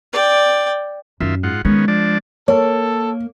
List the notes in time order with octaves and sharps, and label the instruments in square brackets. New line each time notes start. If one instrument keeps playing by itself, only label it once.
[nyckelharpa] D5 G5
[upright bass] F#2 [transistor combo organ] D#3 F4 E5
[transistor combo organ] G#2 F4 F#5
[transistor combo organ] D#3 B3 C#4 [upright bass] G#3
[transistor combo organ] F3 D4 D5
[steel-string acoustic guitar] A#3 [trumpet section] A4 [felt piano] C#5